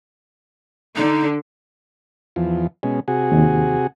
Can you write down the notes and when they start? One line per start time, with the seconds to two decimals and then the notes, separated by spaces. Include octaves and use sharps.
0.97 D3 D#4
2.36 E2 F3
2.83 B2 G#3 C#4
3.08 C3 F#4 G#4
3.32 D#2